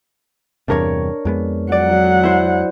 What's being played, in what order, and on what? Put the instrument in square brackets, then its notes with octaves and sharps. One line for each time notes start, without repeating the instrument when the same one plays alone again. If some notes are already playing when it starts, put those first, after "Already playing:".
[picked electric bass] E2 G2 C3 [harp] D4 A#4 C#5
[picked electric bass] F2 G#3 B3
[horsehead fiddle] F#3 F#5 [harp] D5
[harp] E4 C5